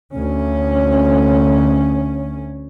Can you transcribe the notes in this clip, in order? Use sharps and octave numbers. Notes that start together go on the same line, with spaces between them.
D2 C#4